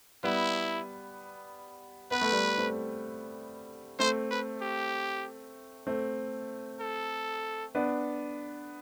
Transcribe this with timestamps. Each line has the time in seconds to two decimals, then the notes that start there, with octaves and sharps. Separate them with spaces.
0.24 G3 B3 E4
2.11 B3 B4
2.21 A3
2.32 G3 B3
2.58 A3 C4
3.99 A3 C4 C5
4.31 B4
4.62 G4
5.87 A3 C4
6.81 A4
7.75 B3 D4